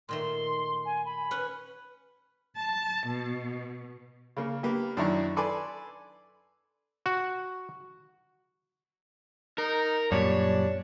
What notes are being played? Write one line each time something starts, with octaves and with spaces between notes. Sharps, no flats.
A#2 D#3 A3 C6
G#5
B5
C#4 B4 F#5
A5
B2
C#3 A#3
A#3 B3 G4
F#2 D#3 D4 E4 A#5 C#6
A4 B4 D5 G#5 C6
F#4
D#4 A#4
F#2 A#2 G3 D4 C#5